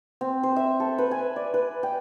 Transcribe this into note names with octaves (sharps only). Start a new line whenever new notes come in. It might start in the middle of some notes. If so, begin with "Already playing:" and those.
C4
C5
E5
A4
B4
G#5
D5
B4
G5